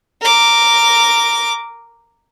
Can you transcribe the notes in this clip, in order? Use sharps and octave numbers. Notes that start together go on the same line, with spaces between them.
A#4 D6